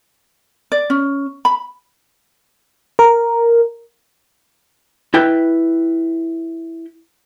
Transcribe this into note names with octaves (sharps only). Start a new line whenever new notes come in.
D5
C#4
B5
A#4
E4 B4 G5